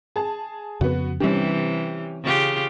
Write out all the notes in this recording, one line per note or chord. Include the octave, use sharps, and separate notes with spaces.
G#4 A5
F2 C#3 B3 F#4
C3 E3 G3 C#4 D4 G4
C#3 F4 G4